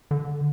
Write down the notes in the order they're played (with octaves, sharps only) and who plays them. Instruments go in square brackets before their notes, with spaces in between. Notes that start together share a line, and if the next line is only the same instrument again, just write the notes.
[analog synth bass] D3